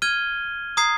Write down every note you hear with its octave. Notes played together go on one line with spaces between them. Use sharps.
F6 G#6 D#7 G7
A#5 D#6 G#6 C7